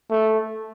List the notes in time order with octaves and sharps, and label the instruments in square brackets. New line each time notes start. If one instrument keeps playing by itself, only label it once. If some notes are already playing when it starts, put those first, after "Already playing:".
[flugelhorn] A3